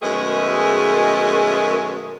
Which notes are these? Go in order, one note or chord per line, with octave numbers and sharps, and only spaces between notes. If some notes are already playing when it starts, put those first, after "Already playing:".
F#2 B2 D#3 G#3 A3 G#4